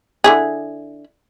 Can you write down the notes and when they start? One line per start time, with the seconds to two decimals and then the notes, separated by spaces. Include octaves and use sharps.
0.24 D3 E4 G#4